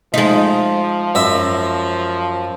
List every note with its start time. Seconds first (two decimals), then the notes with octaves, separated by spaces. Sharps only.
0.14 F3 G#3 D#4
1.15 F#2 D#5 E5